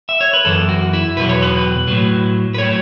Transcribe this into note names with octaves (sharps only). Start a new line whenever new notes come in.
E5
C#5
B4
F#2 E3 A4
F#4
E4
E2 B2 F#3 B4
C#5
B4
A2 F#3
B4
A2 F#3 C#5